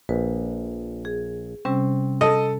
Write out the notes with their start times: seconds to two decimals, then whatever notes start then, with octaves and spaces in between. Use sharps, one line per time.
0.09 A#1 B4
1.05 G#4
1.65 C3 G3 C4 C#4
2.21 A4 D#5